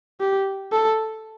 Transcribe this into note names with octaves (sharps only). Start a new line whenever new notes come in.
G4
A4